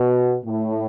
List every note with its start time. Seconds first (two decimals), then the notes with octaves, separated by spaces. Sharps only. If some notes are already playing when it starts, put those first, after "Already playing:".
Already playing: B2
0.44 A2